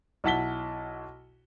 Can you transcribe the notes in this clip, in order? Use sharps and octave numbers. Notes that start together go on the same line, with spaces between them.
B1 E4 F#5 A5 B6 G7